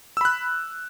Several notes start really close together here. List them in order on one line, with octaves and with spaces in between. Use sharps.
E6 B5 F#6